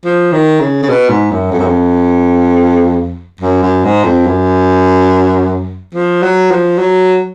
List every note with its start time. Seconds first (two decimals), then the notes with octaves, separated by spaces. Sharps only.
0.05 F3
0.32 D#3
0.60 C#3
0.83 C#3
0.89 B2
1.09 G#2
1.31 F#2
1.51 F2
1.59 F#2
1.66 F2
3.41 F#2
3.63 F#2
3.84 G#2
4.04 F2
4.26 F#2
5.94 F3
6.22 F#3
6.51 F3
6.78 F#3